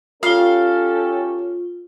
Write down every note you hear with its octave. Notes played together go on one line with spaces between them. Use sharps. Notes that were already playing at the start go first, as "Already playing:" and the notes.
C#4 F4 G4 A4 F5 G7